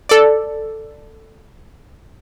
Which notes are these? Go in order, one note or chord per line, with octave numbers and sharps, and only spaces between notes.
A4 D5